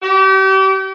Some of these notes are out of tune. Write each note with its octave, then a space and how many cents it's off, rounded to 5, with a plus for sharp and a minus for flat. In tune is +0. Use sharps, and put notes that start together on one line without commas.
G4 -35